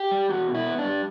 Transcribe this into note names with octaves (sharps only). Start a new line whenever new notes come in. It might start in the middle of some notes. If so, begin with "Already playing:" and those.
Already playing: G4
G3
E2 F#4
B2
E4
B3
D4
G3